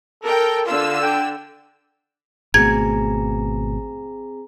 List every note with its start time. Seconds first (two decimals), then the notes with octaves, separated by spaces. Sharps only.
0.24 A4 A#4 G5
0.66 D3 F4 E6
1.02 G5
2.54 G#1 B2 A3 C4 G#4 A#5 G#6